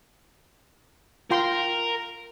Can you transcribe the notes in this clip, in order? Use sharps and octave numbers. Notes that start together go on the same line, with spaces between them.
F4 A#4 G5 C6